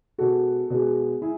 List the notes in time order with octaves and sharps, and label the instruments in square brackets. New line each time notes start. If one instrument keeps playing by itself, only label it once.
[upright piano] B2 G#3 F#4 A4
B2 G#3
G#3 E4 G#4